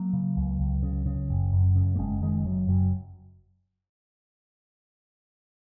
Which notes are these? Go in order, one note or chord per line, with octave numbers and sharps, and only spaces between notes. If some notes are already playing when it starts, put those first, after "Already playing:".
Already playing: F#3 A#3
C#3
C#2
C#2
C#3
C#3
F#1
F#2
C#3
A#3
F#1 G#3 C#4
F#1 D#3 G#3
F#2 F#3
F#1 F#3